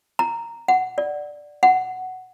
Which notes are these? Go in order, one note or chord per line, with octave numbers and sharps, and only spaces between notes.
A#5
F#5
D5
F#5